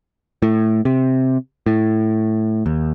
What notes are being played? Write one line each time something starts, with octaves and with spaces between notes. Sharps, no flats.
A2
C3
A2
D#2